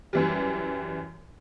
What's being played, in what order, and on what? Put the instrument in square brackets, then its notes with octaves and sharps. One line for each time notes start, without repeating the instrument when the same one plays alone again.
[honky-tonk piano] F#2 E3 G3